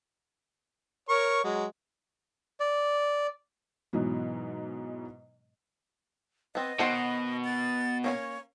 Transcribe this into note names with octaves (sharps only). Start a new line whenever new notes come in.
A#4 C#5 C#6
F#3 G#3
D5
G#2 B2 E3 F#3 B3
B3 C4 D#5
B2 D#3 C5 F#5
A6
A#3 C#4 C#5 G#5